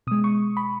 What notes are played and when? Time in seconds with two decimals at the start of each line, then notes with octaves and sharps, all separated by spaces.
0.07 B2 G#3 D#6
0.24 C#6
0.57 B5